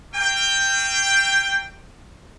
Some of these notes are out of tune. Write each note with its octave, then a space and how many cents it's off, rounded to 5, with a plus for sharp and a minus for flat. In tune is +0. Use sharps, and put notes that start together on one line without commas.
A#3 -35 G5 +10